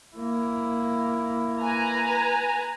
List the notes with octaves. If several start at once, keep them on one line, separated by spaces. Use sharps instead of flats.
A#3 E4
B4 G#5 A#5